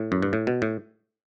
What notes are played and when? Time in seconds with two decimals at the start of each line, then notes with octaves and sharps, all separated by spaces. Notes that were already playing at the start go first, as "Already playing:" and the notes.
Already playing: A2
0.12 F#2
0.22 G2
0.33 A2
0.47 B2
0.62 A2